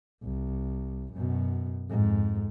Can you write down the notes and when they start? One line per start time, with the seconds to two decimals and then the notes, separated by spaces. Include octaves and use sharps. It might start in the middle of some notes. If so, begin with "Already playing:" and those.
0.24 C2
1.14 F#2 B2
1.90 F2 G#2